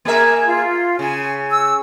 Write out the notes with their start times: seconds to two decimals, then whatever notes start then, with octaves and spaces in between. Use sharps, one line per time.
0.05 A#3 G#4 A#4 E5
0.47 F4
0.99 C#3 G#5
1.49 E6